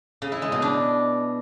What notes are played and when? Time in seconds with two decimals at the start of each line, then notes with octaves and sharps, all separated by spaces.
0.22 C#3
0.32 E4
0.42 G#3
0.52 B2
0.62 D4